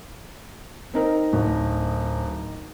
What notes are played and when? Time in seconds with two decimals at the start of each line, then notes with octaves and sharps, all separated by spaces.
0.93 C4 D#4 A#4
1.33 D1